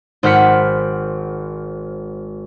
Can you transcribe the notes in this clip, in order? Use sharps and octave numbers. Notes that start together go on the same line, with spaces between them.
G#1 C5 F#5 F6 B6 C#7